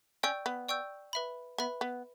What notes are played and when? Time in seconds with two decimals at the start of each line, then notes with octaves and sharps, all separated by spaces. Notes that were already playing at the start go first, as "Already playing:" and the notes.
0.23 C#4 D5 G5 C#6 E6 G6
0.46 B3
0.69 D5 G5 C#6 E6 G6
1.13 B4 E5 B5
1.58 B3 B4 E5 B5
1.81 B3